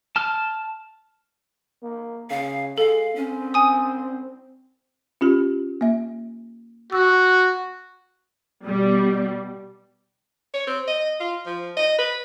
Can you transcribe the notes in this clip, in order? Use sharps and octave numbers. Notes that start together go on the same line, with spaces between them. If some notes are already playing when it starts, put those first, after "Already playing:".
A5 F6
A#3
C#3 F5
G#3 A4 F5
C4 C#4
G#5 D#6
C#4 F4 G4
A#3 E5
F#4 E6
B2 G3
C#5
C4
D#5
F4
F3
D#5
B4